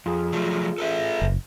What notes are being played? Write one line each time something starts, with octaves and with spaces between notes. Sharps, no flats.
F2 F4 G#4
F3 F#3 A3
A4 B4 E5
F#1